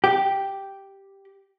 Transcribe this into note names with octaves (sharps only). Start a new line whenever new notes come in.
G4